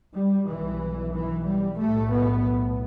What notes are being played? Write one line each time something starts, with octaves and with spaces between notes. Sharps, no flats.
G3
B1 B2 E3
E3
G3
B1 A2 A3
B3